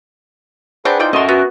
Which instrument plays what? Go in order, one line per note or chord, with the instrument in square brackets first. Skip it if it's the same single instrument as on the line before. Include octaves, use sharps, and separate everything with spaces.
[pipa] C4 D4 G5 [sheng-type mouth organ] G#4 B4 F#5
[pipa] E3 D5 G5 [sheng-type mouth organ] D#4 F4 C5
[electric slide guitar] C#4 A#4 E5 [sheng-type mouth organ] F#4 A4 [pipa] D#5 C6
[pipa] B3 [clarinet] F#4 [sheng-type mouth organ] F#6